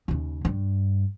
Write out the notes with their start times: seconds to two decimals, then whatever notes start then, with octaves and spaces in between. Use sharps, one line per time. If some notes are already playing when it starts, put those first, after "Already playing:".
0.08 D#2 C#3
0.45 G2